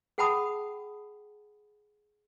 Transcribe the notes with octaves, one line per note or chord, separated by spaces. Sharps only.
G#4 F#5 G5 A5 B5 D#6